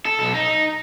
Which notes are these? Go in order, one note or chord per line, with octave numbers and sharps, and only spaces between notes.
A4
B1 A4
D#4